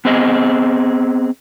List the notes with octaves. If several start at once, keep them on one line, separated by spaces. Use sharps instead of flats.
B3 C4 G#4 D#5